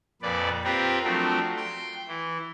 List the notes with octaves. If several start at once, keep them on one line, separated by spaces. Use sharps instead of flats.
F2 A#2 B4 D5
C4 F4 G4 A#4 B4
F3 F#3 A3 C4 D4
G5 C6
E3